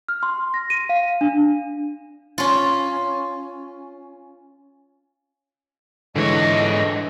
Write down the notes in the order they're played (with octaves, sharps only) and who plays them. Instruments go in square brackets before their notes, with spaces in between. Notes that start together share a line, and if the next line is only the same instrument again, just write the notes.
[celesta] F6
C6
A#6
D#7
F5
D4
[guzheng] C#4 F4
[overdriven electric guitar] G#2 C#5 [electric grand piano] D3 E3 G#3 [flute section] D#5